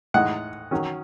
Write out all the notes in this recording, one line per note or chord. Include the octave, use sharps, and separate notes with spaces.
A2 G#3 D#4 F#5
D#3 F#3 C#4